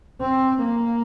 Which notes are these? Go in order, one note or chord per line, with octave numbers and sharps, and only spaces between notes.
C4
A#3